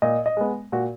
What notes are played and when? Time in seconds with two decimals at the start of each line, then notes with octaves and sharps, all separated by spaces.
0.02 A#2 D#5
0.26 D#5
0.37 G#3 B3
0.72 A#2 F#4